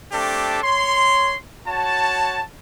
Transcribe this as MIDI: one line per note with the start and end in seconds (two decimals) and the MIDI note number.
0.12 0.58 57
0.12 0.58 60
0.12 0.58 62
0.12 0.58 67
0.12 0.58 69
0.63 1.34 73
0.63 1.34 84
1.68 2.42 66
1.68 2.42 73
1.68 2.42 81